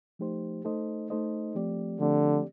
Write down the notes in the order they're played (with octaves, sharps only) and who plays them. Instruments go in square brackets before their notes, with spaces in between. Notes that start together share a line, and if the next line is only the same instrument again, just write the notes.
[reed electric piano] F3 A3 D#4 G4 C5
A3 D#4 A4 C5 D#5
A3 D#4 A4 C5 D#5
F3 A3 C4 G4 D5
[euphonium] D3 [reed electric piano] F3 A3 C4 G4 D5